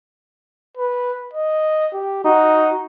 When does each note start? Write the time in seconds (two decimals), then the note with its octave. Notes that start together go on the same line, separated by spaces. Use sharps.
0.77 B4
1.34 D#5
1.93 G4
2.25 D#4 F#4